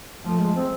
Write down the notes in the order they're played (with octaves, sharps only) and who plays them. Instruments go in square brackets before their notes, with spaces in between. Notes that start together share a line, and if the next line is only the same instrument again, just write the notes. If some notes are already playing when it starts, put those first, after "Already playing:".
[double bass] F3 [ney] A3
[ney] G#3
C4